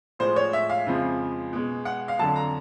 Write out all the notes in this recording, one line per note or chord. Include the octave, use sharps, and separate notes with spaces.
A2 F3 G#3 C5
C#5
E5
F5
F2 C#3 F3 G#3
B2 G#3
F#5
F5
F2 D3 F#3 A5
A#5